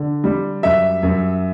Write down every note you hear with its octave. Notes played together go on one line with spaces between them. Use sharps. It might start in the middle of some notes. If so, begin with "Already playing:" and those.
Already playing: D3
G3
F#2 E5
F#2